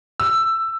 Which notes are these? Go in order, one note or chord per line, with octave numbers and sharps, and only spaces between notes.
E6